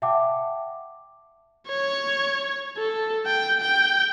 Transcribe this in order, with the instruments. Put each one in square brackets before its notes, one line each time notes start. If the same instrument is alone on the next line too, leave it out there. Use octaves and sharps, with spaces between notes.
[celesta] E5 F#5 G5 A5 D6
[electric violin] C#5
A4
G5
G5